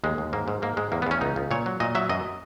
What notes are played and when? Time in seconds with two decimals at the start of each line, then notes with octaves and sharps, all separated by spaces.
0.04 D#2 G#3
0.18 D#2
0.33 G#2 A#3
0.48 G#2
0.62 G#2 A#3
0.77 G#2 G#3
0.92 E2 A#3
1.02 B3
1.06 E2 C#4
1.21 C#2 D#4
1.36 C#2
1.51 A#2 C#5
1.66 F#3
1.80 A#2 D#5
1.95 F#3 E5
2.09 F#2 D#5